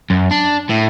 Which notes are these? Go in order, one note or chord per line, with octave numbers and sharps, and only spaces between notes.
F#2
D4
A2